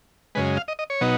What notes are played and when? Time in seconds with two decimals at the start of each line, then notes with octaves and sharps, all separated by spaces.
0.35 F#2 C#3 G#3 B4
0.57 F5
0.68 D#5
0.79 D#5
0.90 C#5
1.01 B2 F#3 B3 D#4